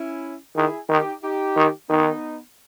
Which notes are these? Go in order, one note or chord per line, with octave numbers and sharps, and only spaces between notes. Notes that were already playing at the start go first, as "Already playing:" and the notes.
Already playing: C#4 E4
D#3 E4 G#4
D#3 D#4 G4
D#4 G4
D#3
D#3 B3 D#4